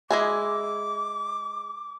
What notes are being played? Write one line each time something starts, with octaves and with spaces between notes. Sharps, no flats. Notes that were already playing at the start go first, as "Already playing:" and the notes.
G#3 E4 G#4 D6